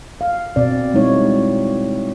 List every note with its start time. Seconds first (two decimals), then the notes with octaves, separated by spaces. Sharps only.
0.21 F5
0.56 B2 C4 D5
0.94 G3 G#3 C4 D#4 E4 C#5